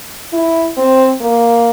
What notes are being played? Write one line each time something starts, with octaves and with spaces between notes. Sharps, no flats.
E4
C4
A#3